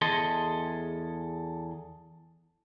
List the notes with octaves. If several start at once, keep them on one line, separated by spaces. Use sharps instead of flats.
E2 G#4 A4 D#5 C6